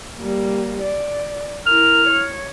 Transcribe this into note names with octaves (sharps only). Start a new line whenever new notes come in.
G3 A#3
D5
E4 A#4 F6
C#5